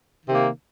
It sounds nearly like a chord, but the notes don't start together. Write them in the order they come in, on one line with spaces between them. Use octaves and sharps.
D#3 C3 A#3